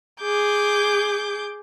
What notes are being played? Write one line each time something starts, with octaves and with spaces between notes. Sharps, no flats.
G#4 D6 G6